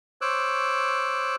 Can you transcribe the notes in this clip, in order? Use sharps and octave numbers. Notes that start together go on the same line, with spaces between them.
C5 C#5 D6 E6 F#6